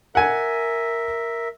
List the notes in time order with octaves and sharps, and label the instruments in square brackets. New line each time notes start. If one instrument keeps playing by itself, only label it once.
[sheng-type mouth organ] A#4 E5 [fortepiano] F#5 G#5